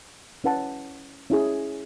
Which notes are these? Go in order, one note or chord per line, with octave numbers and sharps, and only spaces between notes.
C#4 E4 B4 F#5 A5
C#4 E4 G#4